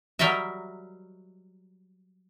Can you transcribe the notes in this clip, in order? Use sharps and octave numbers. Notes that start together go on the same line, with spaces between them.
F#3 G3 A#4 D#5 E5